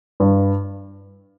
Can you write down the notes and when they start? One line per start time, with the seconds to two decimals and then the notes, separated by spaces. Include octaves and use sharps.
0.20 G2